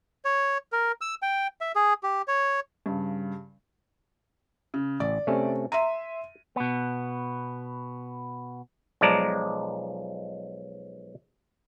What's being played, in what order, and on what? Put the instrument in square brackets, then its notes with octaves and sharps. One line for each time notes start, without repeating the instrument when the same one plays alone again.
[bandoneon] C#5
A#4
E6
G5
E5
G#4
G4
C#5
[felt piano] G2 C#3
C#3
[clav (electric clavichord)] A1 [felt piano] D5
[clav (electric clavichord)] C3 A3 C#4
[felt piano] E5 C6 D#7 [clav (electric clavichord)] A#5
[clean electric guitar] B2 B3
[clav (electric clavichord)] B1 F3 G#3 D5 A5 A#5